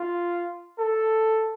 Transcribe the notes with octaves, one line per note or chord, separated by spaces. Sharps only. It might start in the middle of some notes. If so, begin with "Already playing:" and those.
Already playing: F4
A4